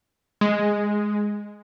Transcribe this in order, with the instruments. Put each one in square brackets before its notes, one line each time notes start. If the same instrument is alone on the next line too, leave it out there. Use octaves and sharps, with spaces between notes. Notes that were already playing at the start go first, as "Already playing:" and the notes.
[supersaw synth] G#3